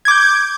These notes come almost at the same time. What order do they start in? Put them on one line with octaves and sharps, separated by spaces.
G#6 D6 G6